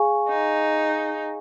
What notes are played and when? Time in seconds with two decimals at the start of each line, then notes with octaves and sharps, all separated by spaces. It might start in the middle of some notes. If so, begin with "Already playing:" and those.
Already playing: G#4 F5 G#5 C#6
0.29 D#4